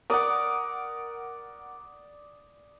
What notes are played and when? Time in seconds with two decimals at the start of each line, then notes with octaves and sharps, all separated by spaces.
0.10 A#4 D5 F#5 D6 D#6